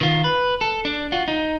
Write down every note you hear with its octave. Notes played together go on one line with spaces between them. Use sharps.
D#3 F4
B4
A4
D4
F4 F#4
D#4